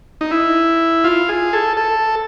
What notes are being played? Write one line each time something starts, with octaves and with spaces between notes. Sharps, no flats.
D#4
E4
F4
G#4
A4
A4